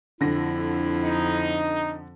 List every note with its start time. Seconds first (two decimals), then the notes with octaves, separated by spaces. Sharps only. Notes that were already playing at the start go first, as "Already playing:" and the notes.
0.21 F2 D3 E4 A#6
1.03 D#4